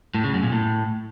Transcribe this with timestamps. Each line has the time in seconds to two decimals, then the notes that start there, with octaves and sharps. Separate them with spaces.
0.14 A2
0.24 C#3
0.33 F#2
0.43 A#2
0.52 A2